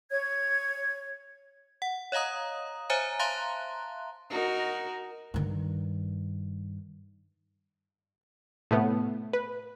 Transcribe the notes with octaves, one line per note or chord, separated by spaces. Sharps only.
C#5 G#6
F#5
C#5 D#5 F5 A#5 D#6
C5 C#5 E5 G#5 A#5
E5 F5 A5 A#5 C6 F#6
D#4 F#4 A#4
G2 D#3
A2 C3 A3 B3
B4